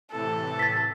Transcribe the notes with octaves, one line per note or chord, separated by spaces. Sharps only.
A2 C3 E3 A4
A6 B6